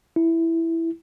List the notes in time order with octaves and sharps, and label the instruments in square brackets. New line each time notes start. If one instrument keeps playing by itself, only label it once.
[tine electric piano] E4